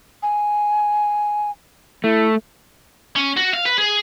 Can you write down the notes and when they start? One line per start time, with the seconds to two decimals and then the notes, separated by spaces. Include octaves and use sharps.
0.23 G#5
2.04 A3 E4
3.16 C#4
3.37 F#4
3.53 F5
3.65 B4
3.78 G#4